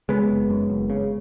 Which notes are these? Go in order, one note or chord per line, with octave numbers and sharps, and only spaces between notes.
C#3 G#3 B3
F#1
F#2
F#1
C#3